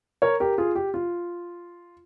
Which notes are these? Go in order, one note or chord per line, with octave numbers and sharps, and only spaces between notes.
A#4 C#5
G4 A#4
F4 G#4
G4
F4